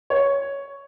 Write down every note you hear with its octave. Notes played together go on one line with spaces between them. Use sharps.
C#5